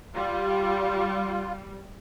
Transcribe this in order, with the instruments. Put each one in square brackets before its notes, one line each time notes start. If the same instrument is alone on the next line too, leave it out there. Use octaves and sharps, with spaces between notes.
[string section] G3 [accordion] F4